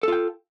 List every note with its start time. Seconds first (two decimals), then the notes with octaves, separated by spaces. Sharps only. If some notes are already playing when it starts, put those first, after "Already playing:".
0.03 A4
0.08 F4
0.12 G5